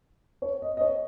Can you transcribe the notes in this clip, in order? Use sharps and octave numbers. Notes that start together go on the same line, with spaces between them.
C#5
D#5
D#5
C#5